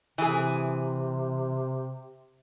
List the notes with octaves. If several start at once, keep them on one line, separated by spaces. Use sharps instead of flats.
C3 E3 G#4